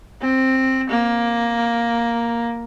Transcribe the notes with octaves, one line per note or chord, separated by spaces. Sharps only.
C4
A#3